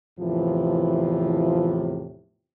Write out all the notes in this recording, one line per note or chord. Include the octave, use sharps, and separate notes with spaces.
E2 A2 C3 E3 F3